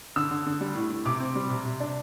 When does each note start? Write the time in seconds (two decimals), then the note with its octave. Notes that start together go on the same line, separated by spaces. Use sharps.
0.16 D3 E6
0.31 D3
0.46 D3
0.61 G3
0.75 A2
0.90 A2
1.05 C3 D6
1.20 C4
1.36 G3
1.50 C3
1.65 C3
1.80 D4